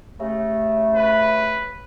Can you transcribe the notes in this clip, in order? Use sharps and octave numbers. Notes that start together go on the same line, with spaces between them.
C#3 A3 G4 E5
B4